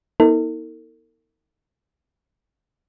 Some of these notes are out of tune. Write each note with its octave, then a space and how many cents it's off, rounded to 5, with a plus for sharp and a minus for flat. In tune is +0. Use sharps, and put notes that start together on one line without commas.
B3 -35 D#4 +45 A4 +45